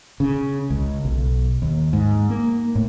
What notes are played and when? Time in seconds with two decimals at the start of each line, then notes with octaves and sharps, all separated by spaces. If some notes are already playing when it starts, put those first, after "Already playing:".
0.20 C#3
0.70 C#2
1.05 B1
1.62 D#2
1.93 G#2
2.30 A#3
2.75 A2